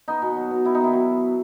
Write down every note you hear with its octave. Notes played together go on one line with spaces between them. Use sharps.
B3 D#4
B2
F#3
B2
B3 E4
D#4
D#3 E4
F#3